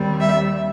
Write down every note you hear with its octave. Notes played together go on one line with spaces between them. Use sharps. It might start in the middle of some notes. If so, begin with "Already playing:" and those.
Already playing: D#2 D#3 G3 C4
E5